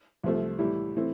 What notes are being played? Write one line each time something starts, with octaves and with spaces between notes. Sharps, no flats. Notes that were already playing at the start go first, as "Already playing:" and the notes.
C2 C3 F3 A3
A2 E3 G3 E4
E3 A3 C4